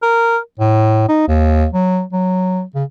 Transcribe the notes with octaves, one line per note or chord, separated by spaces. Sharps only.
A#4
A2
D#4
D#2
F#3
F#3
C#3